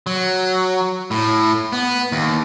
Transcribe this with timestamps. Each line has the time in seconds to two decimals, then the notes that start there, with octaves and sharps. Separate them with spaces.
0.07 F#3
1.11 A2
1.73 B3
2.12 D#2